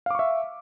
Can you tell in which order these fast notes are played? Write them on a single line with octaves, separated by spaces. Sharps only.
F5 D6 C#6 E5